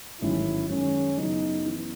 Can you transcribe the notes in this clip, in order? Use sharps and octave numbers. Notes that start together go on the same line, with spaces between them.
A1 G#2 D#3 F#3 C#4 E4
F#2 D#3 G#3 C#4
F#2 C#3 F#3 B3 D#4 E4
F#2 E3 B3 E4